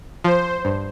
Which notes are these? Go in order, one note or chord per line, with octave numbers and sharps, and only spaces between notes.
F3 C5
G2